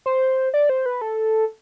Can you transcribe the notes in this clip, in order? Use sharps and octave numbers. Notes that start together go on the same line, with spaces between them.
C5
D5
C5
B4
A4